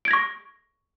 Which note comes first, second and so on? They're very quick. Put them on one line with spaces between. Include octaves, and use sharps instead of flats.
D7 G#6 A#6 C#6